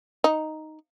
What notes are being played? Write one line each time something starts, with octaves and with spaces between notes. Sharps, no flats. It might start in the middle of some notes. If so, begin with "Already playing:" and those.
D#4